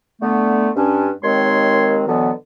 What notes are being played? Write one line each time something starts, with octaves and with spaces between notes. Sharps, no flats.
D3 A3 B3
G2 C#4 D4
D#2 D#3 G#3 C4 C#5 C6
B2 D3 E3 F#3 B3